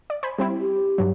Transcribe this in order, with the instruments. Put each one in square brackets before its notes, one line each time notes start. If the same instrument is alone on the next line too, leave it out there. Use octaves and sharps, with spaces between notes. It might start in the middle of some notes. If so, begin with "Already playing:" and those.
[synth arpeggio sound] D5
C5 G#5 B5
G3 C4 E4
[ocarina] G4
[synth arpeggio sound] G2 F#3